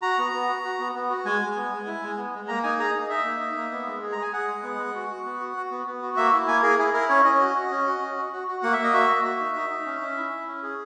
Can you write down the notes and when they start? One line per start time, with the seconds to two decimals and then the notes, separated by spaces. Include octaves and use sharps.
0.02 F#4 A#5
0.19 B3
0.33 B3
0.49 F#4
0.64 F#4
0.80 B3
0.95 B3
1.10 F#4
1.25 G#3 G#5
1.41 G#3
1.56 B3
1.72 G#3
1.87 E4
2.03 G#3
2.17 B3
2.33 G#3
2.48 A#3 A#5
2.63 D#4 G#5
2.79 G#4 A#5
2.94 D#4
3.09 D#4 E5
3.25 A#3
3.41 D#4
3.57 A#3
3.72 B3
3.86 G#3
4.02 G#4
4.12 A#5
4.18 G#4 G#5
4.33 G#4 F#5
4.48 G#3
4.63 B3
4.79 G#3
4.95 F#4
5.09 F#4
5.25 B3
5.40 F#4
5.56 F#4
5.71 B3
5.86 B3
6.02 F#4
6.17 A#3 E5
6.33 E4
6.48 A#3 G#5
6.63 G#4 A#4
6.79 E4 G#4
6.93 E4 A#4
7.09 C#4 C#5
7.24 C#4 D#5
7.40 F#4
7.55 F#4
7.71 C#4
7.87 F#4
8.02 C#4
8.17 F#4
8.33 F#4
8.48 F#4
8.63 A#3 F#5
8.73 E5
8.79 A#3
8.84 D#5
8.94 F#4 E5
9.09 A#3
9.24 F#4
9.40 D#4
9.56 D#4
9.70 D#4
9.86 C#4
10.01 C#4
10.17 E4
10.32 E4
10.47 C#4
10.63 G#4